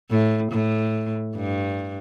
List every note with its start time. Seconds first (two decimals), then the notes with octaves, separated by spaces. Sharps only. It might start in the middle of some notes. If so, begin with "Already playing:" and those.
0.10 A2
0.52 A2
1.36 G2